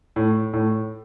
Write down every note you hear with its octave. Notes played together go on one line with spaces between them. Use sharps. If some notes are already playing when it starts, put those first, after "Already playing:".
A2
A2